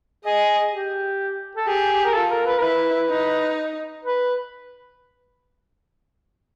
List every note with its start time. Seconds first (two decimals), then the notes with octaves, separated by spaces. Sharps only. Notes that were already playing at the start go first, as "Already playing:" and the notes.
0.25 G#4 D#5
0.71 G4
1.57 A4
1.67 G4 G#4
2.05 A#4
2.14 F4 A4
2.31 A#4
2.46 B4
2.58 A#4
2.62 E4 B4
3.10 D#4
4.04 B4